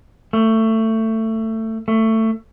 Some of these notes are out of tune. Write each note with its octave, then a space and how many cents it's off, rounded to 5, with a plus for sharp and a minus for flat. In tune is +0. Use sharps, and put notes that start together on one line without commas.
A3 +20
A3 +20